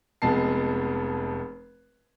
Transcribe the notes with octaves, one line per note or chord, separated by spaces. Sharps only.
F1 F2 G#3 B3 A5 C7